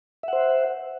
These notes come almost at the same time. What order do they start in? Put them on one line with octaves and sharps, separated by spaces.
E5 F#5 C5